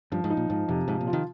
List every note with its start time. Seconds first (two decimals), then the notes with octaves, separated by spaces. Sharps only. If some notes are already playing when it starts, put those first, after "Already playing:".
0.12 G2 F3
0.24 G#2
0.30 D#4
0.37 A#2
0.50 G#2 F3
0.68 F2 C3
0.87 G#2 F3
1.01 A#2
1.07 F4
1.13 D#3